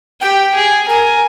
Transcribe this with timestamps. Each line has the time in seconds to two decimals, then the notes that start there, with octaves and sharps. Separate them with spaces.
0.21 G4 G5
0.54 G#4
0.88 A#4 G#5